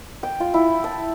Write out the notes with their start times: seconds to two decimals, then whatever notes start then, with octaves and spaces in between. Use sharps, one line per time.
0.23 G5
0.40 F4
0.54 E4
0.84 A5